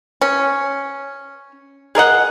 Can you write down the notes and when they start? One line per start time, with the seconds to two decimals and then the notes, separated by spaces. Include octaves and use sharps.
0.21 C#4
1.95 G#4 A#4 D#5 F#5